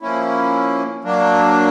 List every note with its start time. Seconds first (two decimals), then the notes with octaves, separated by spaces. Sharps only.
0.01 F3 A#3 C#4 E4
1.04 F#3 A#3 D4